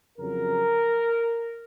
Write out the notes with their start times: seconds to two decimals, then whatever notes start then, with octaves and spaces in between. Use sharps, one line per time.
0.17 F2 C#3 F#3 A#4